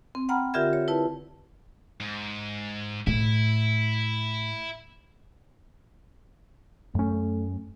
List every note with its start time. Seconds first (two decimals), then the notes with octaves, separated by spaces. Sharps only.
0.15 C4
0.29 F#5 G5 A#5 B5 F6
0.54 D3 F4 G4 A#4 E5 G#6
0.73 C#5
0.88 E4 B4 A5
2.00 G#2
3.07 A2 E4
6.95 F#2 A3 C#4